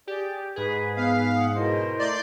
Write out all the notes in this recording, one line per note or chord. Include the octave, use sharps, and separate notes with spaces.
G4 G#4 D5
G#2 G#4 B4
B3 F5
F#5 D#6
B2 E4 A#4 C5 D#5
A3 D5 C6 D6 G6